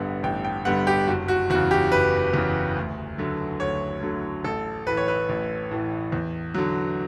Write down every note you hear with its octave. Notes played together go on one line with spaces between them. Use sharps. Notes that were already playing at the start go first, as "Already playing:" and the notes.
Already playing: A1 G2 D3 G3 B3 F#5
A1 G5
G5
G2 D3 G3 B3 F#5
G4
F#1 F#4
F#4
E2 C#3 F#4
G4
F#1 B4
E2 C#3
D2
D3 F#3 A3
D2 C#5
D3 F#3 A3
A1 A4
A2 E3 B4
C#5
B4
A1
A2 E3
E2
D3 F#3